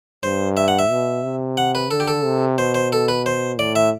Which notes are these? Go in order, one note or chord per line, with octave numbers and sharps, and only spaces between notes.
G2 C5
E5
F#5
E5
B2
C3
F#5
B4
D3 A4
G4
A4
C3
B2 C5
C5
A4
B4
C5
A2 D5
E5